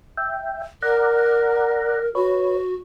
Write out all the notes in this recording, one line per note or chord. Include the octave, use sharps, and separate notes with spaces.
E5 G5
A#4 D5 F#5 A#5
F#4 B4 C#5